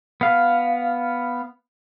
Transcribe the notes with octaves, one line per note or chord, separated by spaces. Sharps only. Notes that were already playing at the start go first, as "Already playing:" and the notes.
B3 F5